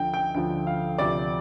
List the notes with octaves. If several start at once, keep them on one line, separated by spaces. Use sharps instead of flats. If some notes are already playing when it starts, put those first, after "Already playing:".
Already playing: D2 D3 F3 G5
G5
D2 D3 F3 G5
F5
D2 C3 F3 D5